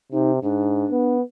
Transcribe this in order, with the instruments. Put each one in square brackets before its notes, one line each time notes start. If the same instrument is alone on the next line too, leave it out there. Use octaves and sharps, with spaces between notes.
[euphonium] C3 [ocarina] D#4
[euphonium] G#2 [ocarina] D4
[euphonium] B3